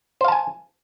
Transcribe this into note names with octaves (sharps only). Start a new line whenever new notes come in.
C5 F5 G#5 A5